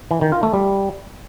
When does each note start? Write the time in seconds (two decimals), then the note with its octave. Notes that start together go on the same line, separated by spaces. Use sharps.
0.11 E3
0.21 D#3
0.32 F4
0.43 A3
0.54 G3